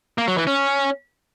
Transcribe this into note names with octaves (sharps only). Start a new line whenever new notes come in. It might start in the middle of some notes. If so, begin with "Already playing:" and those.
A#3
F#3
E3
C#4